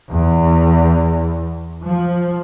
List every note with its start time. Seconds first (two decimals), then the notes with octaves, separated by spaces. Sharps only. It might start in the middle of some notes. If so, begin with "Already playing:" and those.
0.11 E2
1.83 F3